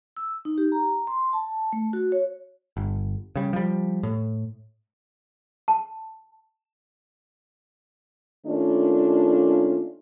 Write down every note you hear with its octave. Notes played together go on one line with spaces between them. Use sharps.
E6
D#4
G4
A#5
C6
A5
A3
F#4
C#5
G1
C#3 G3
F3 G3
A2
A5
D#3 A3 A#3 C#4 D4 F4